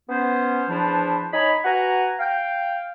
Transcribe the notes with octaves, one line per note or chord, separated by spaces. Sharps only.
B3 C#4 C5
E2 F3 D4 E4 B4 C5
D#4 C#5 G#5 A#5 B5
F#4 B4 F#5 G#5 A#5
F5 G5